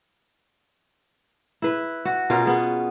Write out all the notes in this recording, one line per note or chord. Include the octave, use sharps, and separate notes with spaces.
E4 B4
F#4
B2 C#4 F4 A#4
B3 G#4